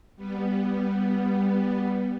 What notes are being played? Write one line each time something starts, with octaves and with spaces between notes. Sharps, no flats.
G3 B3